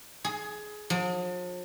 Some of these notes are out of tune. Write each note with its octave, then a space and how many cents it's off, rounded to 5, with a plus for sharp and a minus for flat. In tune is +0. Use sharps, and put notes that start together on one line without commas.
G#4 +20
F3 +45